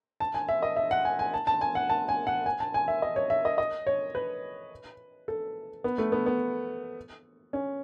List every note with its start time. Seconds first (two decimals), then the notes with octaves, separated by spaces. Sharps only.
0.20 A5
0.34 G#5
0.49 E5
0.62 D#5
0.76 E5
0.91 F#5
1.05 G#5
1.19 G#5
1.34 A5
1.47 A5
1.61 G#5
1.75 F#5
1.90 A5
2.09 G#5
2.27 F#5
2.46 G#5
2.60 A5
2.74 G#5
2.88 E5
3.02 D#5
3.16 C#5
3.30 E5
3.45 D#5
3.58 D#5
3.87 C#5
4.15 B4
5.28 A4
5.84 B3
5.98 A3
6.12 B3
6.26 B3
7.53 C#4